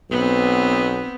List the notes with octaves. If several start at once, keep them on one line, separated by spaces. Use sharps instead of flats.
B1 B3 C4